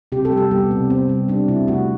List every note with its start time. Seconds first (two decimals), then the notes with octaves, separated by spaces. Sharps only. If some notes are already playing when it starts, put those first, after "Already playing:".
0.12 C3 G4
0.25 A4
0.32 G3
0.37 G4
0.51 G3 B3
0.71 C3
0.90 C3 C4
1.09 G3
1.28 G3 D4
1.48 C3 E4
1.68 A3 F#4